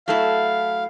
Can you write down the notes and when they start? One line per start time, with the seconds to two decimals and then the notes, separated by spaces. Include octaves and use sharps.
0.08 F#3 A3 E4 F5